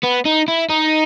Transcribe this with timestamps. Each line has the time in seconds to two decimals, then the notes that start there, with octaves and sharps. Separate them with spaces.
0.03 B3
0.25 D#4
0.48 E4
0.69 D#4